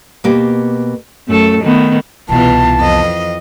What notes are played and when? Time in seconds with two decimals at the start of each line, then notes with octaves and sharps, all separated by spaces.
0.24 B2 A#3 G4
1.28 F#2 A3 A4
1.62 D#3 A3 B3
2.29 C2 B2 E3 B3 F4 A5
2.78 F2 D#5